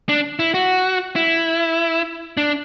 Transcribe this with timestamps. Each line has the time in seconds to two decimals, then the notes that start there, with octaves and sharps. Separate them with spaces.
0.09 D4
0.39 E4
0.54 F#4
1.16 E4
2.37 D4